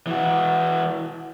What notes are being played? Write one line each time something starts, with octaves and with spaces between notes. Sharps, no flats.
E3 F#4